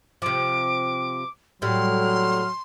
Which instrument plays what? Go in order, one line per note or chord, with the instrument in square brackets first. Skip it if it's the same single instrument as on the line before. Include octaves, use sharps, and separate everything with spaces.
[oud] C3 F3 [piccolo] D6
[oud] A2 G3 [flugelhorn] F#3 [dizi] C6 [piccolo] F6